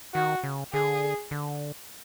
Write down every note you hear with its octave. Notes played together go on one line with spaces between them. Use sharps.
D#3 F#4
C#3
D3 G#4
D3